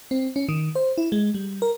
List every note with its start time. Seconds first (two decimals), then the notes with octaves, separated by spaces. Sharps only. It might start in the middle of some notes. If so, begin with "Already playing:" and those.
0.11 C4
0.36 C#4
0.49 D#3
0.75 C5
0.98 E4
1.12 G#3
1.34 G3
1.62 A#4